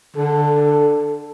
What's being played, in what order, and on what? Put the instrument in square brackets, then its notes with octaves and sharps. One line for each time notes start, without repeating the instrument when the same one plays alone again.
[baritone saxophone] D3 [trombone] A4